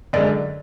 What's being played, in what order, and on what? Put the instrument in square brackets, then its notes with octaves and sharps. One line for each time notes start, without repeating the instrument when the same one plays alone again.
[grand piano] F#2 D3 G#3 D4 [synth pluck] D5